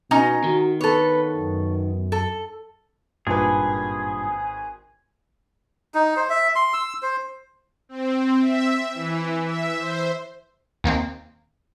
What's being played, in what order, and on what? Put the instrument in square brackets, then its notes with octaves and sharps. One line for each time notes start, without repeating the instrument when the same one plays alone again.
[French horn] B2 [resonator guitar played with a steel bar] C#4 D#4 A#5
[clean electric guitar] D#3 [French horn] F#4
[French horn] B3 [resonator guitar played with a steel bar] A4 C#5 [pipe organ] B4
[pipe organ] F#2
[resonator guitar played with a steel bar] A4
[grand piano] G#1 B4 [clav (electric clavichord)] G2 A#2 [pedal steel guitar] G#4
[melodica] D#4
C5
E5
C6
E6
C5
[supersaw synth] C4
E5
E3
E5
C5
[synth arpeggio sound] D#2 D#3 A#3 C4